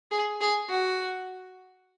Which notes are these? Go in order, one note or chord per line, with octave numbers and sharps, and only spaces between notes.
G#4
G#4
F#4